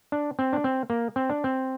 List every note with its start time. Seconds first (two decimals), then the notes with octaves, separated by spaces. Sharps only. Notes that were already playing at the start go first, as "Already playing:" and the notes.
0.12 D4
0.39 C4
0.53 D4
0.64 C4
0.90 A#3
1.16 C4
1.30 D4
1.44 C4